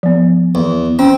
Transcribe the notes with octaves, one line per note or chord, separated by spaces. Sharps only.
F3 B3
E2
C4 C#4